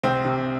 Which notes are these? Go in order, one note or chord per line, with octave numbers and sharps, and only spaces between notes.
C2 C4
C3